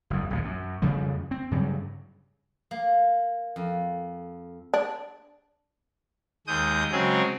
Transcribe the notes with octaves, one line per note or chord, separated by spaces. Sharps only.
F#1 E2
A#1 D#2 A#2
F#2
F2 C#3 F3 G3
C4
G2 C#3 F#3 G3
A#3
F2
D4
D#2 G#3 D#6 G6
C#3 F#3 G#3 C4 G#4